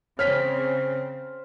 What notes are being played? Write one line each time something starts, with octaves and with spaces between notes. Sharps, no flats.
C#3 C4 C5 C#5 F6 B6